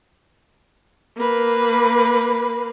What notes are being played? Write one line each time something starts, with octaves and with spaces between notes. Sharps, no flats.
A#3 B4